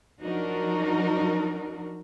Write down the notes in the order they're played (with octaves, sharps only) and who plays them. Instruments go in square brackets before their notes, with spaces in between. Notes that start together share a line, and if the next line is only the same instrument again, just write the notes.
[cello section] F3 F#3 D4 D#4 F#4 A#4